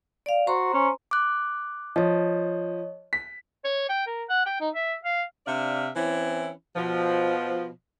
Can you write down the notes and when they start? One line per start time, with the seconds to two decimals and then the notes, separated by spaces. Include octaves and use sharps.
0.26 D5 F5
0.47 F#4 C5 A#5 C6
0.74 C#4
1.11 D6 F#6
1.96 F3 C#5 D#5
3.13 B6
3.64 C#5
3.89 G5
4.07 A#4
4.30 F#5
4.46 G5
4.60 D#4
4.74 E5
5.05 F5
5.46 C3 D4 D5 E5 F5
5.95 E3 C4 C#4 E4
6.76 B2 F3